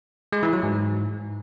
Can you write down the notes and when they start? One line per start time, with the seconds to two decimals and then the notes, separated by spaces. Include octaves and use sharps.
0.33 G#3
0.43 E3
0.53 F#3
0.63 G#2